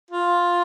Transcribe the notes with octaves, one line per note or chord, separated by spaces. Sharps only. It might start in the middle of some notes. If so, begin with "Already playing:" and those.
F4